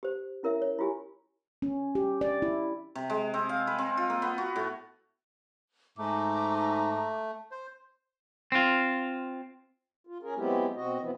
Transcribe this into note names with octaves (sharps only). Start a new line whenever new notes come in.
G4 C5
C#4 E4 A#4 C#5 E5
C#5
E4 F4 G4 G#5
C#4
G4
D5
E4
C3
G#3
C4
F5
B4
C4
F4
A#3
B3
F#4
A2
G#2 A3 A#5 D6 E6
C5
C4 F4
F4
C#4 G#4 A#4
F#3 G#3 B3 C4 E4 G4
B2 C4 F#4 D#5
E3 F3 B3 C4 E4